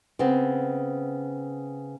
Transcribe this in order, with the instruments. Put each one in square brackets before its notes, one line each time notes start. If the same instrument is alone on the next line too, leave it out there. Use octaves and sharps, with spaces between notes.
[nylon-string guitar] C#3 B3 C4